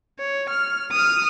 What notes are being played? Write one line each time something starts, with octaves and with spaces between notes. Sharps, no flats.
C#5
F6
D#6 F6